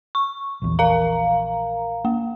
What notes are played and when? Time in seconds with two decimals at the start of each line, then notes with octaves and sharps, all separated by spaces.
0.15 C#6
0.62 A#1 E2
0.79 A#4 F5 A#5
2.05 A#3